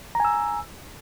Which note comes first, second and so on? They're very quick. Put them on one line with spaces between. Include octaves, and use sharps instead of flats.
A#5 G#5 E6